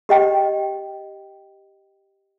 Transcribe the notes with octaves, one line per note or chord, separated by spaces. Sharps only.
G4 D#5 G5